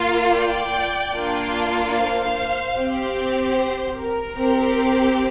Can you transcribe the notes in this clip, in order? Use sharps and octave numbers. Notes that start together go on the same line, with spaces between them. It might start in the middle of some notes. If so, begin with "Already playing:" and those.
Already playing: A#3 F4
D5 G5
A#3 D4 F4
C5 F5
C4 G4
C5
A#4
C4 G4